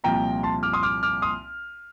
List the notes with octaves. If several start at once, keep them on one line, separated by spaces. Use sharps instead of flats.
C2 A#2 F3 C4 G5 A#5
A5 C6
D6 F6
C6 D#6
D6 F6
D6 F6
C6 D#6